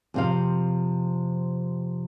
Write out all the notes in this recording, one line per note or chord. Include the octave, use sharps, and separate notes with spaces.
F2 C3 F5